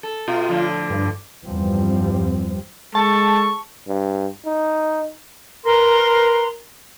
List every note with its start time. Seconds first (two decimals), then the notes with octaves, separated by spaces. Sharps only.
0.03 A4
0.28 B2 F4
0.49 A2 D3 F3
0.90 G2
1.45 E2 G2 F3 G3 C4
2.95 G#3 A4 A5 C#6
3.88 G2
4.46 D#4
5.66 A#4 B4 A#5 C6